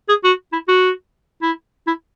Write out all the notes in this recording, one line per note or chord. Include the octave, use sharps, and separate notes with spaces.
G#4
F#4
E4
F#4
E4
E4